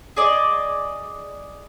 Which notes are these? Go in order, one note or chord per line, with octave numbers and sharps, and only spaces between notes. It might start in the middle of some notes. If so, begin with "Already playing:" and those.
G#4 D5 D#5